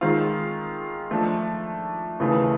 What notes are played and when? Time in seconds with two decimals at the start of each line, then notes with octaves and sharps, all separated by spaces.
0.01 D#3 G#3 C4 F4
1.11 F3 A3 D4
2.19 D#2 C#3 E3 A3